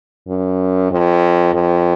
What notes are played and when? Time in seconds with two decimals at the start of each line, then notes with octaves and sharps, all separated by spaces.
0.28 F#2
0.91 F2
1.54 F2